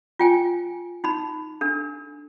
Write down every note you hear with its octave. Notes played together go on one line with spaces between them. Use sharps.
F4 G5 G#5
D#4 B5
D4 A4